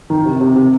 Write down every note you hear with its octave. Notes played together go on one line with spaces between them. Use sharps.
D#3
C3
C3
C3